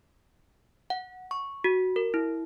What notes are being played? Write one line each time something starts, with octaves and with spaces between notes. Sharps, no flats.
F#5
C#6
F#4
A#4
E4